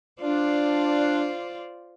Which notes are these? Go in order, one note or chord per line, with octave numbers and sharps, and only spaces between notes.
D4 F4 C5 D5